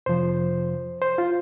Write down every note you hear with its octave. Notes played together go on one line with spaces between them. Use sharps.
F2 C3 F3 C5
C5
F4